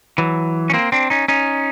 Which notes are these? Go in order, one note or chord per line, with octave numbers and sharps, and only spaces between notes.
E3 F#3
C#4
A#3 C4
C4 D4
C#4 D#4
C#4 D#4